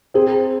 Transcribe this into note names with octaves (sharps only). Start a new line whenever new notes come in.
C4 G#4